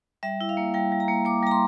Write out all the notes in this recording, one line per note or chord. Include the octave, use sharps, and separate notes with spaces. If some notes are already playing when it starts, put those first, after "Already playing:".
G3 E5
E4
F5
A#3
G3 G5
G3
A#5
A#3
A#3 D6
G3 A#5
C6